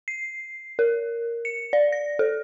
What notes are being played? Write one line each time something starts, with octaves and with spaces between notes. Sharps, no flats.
C7
A#4
C#7
D5
A#6
A4